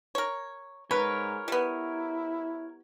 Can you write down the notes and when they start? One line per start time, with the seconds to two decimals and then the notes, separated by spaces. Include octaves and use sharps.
0.15 A#4 C#5
0.91 G#2 A#4 B4 C#5
1.48 G3 B3 E4